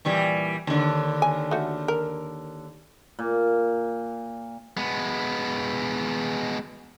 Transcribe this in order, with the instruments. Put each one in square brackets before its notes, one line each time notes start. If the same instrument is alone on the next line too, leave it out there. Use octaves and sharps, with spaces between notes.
[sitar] A#2 E3 G3
D#2 D3
[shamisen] G#5
A3 F#4
A#4
[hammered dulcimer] A#2
[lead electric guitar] G#3 B3